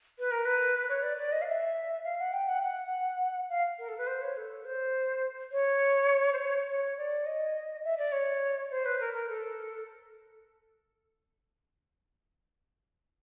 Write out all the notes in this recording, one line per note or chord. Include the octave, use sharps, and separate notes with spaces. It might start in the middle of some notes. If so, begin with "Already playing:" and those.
B4
A#4
B4
C#5
D5
D5
D#5
F5
E5
F5
F#5
G5
F#5
F#5
F5
A#4
A4
B4
C5
C#5
A4
C5
C#5
C5
C#5
C#5
D5
D#5
E5
D5
C#5
C5
B4
A#4
A#4
A4